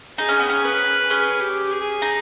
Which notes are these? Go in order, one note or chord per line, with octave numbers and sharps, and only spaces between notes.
D#4 G#4
C#4
B3
C#4
B4
C#4 G#4
G4
G#4
D#4